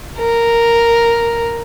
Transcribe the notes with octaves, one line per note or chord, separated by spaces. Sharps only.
A#4